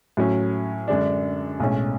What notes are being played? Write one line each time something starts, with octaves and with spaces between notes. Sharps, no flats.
A2 F#3 C#4
F#2 D3 G#3 D4
B1 A2 G#3 C#4